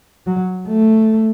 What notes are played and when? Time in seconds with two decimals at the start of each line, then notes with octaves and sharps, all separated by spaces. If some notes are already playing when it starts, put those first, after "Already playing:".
0.27 F#3
0.68 A3